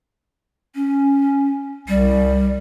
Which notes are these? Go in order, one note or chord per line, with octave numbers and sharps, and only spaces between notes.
C#4
C2 G3